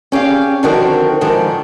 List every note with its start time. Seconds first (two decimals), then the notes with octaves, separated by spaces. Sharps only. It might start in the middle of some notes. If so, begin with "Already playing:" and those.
0.12 C#4 G4 G#4 F5
0.63 D3 D#3 F3 C4 F#4 A#4
1.21 G#2 D3 D#3 F3